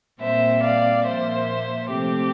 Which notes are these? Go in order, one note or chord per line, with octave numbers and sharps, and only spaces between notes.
A#2 G3 C4 C5 E5
D5 F5
A#2 F3 A#3 C5 E5
C3 F3 A3 C4 G4